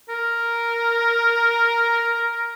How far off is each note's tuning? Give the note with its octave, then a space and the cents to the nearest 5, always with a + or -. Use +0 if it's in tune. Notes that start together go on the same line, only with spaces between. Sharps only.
A#4 +0